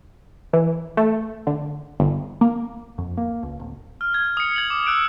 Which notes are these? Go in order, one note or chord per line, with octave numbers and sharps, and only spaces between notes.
E3
A3
D3
G1
A#3
F2
A#3
C#2
D1
F6
G#6
D#6 C#7
G#6 F#7
D6
E6 F#6 D7